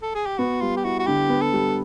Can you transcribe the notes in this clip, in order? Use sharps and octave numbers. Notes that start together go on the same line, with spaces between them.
A4
G#4
G4
B3 F#4
G3 F4
G4
E4 F#4
F#4
D3 G4
B3
A4
G3